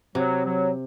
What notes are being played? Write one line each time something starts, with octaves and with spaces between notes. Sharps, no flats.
C3 F#3
F#3